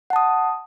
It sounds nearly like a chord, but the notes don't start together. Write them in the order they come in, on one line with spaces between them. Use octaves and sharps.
F#5 A5 D#6